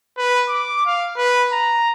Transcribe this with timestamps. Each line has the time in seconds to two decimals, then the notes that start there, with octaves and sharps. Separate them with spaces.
0.17 B4
0.49 D6
0.86 F5
1.17 B4
1.52 A#5